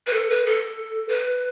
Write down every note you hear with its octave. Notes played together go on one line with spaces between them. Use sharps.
B4
A4
B4
A4
B4